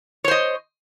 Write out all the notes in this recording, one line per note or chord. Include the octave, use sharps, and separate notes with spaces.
C5 C#5 D#5